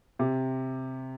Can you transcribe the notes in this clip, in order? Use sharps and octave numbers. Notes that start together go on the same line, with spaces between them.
C3